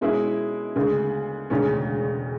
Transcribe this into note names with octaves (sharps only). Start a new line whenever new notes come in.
B2 G#3 C#4 E4
D2 C#3 G#3
E1 D2 C#3 G#3 C#4